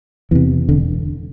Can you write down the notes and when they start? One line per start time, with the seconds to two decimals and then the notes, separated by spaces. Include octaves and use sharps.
0.31 E2 C3 E3
0.69 E1 D3